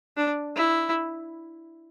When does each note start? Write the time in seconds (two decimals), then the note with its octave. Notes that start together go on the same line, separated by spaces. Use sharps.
0.17 D4
0.56 E4